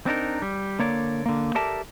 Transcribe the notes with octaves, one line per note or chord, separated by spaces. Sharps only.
C4 D4 D#4 A#4
G3
D3 A#3 C#5 D5
D3 A#3
G4 A4 A#4 D5 E5 A5